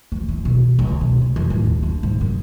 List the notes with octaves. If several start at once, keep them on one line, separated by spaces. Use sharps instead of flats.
F3
E3
B2
C#2
B2
C#2
F2
A2
D#2
D4
G#2
F#2